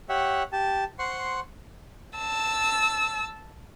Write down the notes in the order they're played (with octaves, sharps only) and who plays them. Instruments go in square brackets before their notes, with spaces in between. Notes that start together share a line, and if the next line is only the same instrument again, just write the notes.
[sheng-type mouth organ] G4 C#5 E5 F#5
G4 A5
C5 F#5 C6 C#6
[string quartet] A5 E6